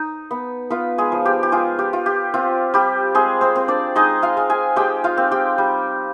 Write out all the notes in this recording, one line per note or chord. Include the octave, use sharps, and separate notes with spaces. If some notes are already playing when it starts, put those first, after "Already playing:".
Already playing: D#4
B3
B3 F4 B4
G#3 G#4
F3
G4
G4
G#3 F4 G#4
G4
F4
G4
C4 F4
G3 G4
G#3 C4 G#4
C4 C5
C4
D4 D5
G#3 D#4 D#5
F4 F5
G#3
G#4 G#5
G#3 G4 G5
F4 F5
C4
G4 G5
G3